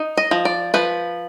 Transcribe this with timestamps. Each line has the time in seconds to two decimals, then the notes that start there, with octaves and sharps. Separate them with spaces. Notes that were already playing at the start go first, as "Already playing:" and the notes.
Already playing: D#4
0.17 D#5
0.31 F3
0.45 D5
0.74 F3 B4